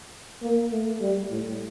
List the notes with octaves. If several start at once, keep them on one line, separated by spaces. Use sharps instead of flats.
A#3
A3
G3
A2